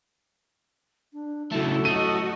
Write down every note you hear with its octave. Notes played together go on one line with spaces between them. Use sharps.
D4
C#3 F#3 A3 E4 A4
A3 F#4 D#5 D#7